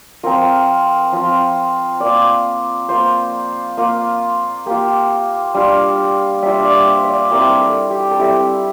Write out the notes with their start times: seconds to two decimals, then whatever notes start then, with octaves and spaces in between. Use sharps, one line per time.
0.23 F3 C4 F4 A#4
1.12 F3 C4 F4
2.00 A#3 F4 D5
2.89 A#3 F4 C5
3.77 A#3 F4
4.66 A#3 F4 G4
5.54 G3 D4 F4
6.42 G3 D4 F4 E5
6.65 D5
6.87 C5
7.04 E5
7.09 D5
7.31 G3 C4 E4 A#4
7.60 A4
7.90 G4
8.11 A4
8.19 G3 C4 E4 G4